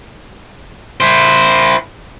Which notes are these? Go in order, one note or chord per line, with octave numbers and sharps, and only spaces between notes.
E4 C5